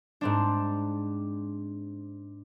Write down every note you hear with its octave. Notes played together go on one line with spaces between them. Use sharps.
G#2 C4 D4